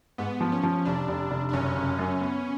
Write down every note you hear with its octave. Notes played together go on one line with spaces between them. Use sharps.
G#2 B3
F3
C#4
F3
F1 D4
F1
F1
D4
F#1 C#4
F#1
F#2
B3